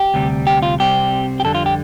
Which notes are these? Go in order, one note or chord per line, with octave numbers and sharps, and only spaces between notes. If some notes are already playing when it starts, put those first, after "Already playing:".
Already playing: G4
D2 C3 G3
G4
F4
C2 C3 G3 C4 G4
G4
F2 D3 G3 A4
F4
G4